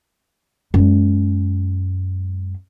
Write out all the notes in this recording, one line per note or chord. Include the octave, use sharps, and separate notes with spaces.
F#2 G#3